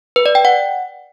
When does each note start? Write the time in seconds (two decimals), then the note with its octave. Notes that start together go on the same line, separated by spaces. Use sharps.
0.16 B4
0.26 D5
0.35 G5
0.45 F#5